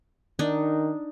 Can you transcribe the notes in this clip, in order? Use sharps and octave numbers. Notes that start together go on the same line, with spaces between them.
D#3 D4 D#4